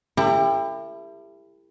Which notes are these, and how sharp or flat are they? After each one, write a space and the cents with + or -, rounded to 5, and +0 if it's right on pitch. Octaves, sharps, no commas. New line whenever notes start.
E4 +20 G4 +30 A#4 -40